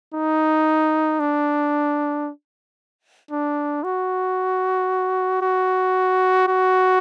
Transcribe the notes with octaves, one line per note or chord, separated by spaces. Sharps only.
D#4
D4
D4
F#4
F#4
F#4